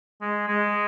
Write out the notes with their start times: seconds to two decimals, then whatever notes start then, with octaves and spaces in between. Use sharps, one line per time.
0.21 G#3
0.48 G#3